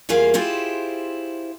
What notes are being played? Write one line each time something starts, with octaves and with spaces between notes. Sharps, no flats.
E2 G3 A#3 F4 G#4 F5
E4 F4 G4 G#4 C5